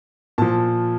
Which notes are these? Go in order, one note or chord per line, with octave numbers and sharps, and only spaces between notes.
A#2 F3 A5